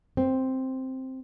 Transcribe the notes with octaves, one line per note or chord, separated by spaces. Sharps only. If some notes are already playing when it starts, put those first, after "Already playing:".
C4